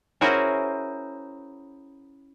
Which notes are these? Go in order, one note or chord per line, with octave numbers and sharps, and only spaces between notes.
C#4 E4 F#4 G#4 A#4 C5